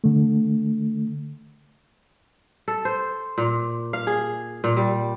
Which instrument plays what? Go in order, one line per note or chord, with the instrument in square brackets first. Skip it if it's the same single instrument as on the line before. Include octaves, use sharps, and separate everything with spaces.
[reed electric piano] D3 A3
[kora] A4
C5
A#2
F5
G#4
A#2
G3